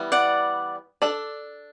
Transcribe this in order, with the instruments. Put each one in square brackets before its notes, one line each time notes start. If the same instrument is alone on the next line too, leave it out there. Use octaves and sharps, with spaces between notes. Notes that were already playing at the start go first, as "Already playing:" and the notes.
Already playing: [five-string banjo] E3 G3 B3
[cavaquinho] D5 F#5
[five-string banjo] D4 A4 D5